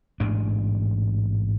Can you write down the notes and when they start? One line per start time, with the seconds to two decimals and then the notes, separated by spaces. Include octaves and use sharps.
0.20 A1 G#2 B2 D4